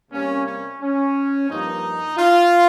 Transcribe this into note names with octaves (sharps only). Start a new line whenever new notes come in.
C3 G3 A#3 C#4
C#4
C#4
G2 F3 A#3 D#4
F4